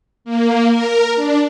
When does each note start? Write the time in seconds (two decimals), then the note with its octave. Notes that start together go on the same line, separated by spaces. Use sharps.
0.25 A#3
0.68 A#4
1.15 D4